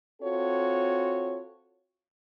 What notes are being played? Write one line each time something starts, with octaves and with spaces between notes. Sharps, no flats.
C4 F4 F#4 A4 C#5